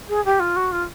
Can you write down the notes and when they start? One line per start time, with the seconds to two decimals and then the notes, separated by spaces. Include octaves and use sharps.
0.09 G#4
0.25 G4
0.40 F4
0.56 F#4
0.72 F4